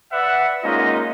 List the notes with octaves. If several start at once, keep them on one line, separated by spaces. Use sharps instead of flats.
B4 D5 E5 F#5
G#3 A#3 C#4 D#4 F4 D#5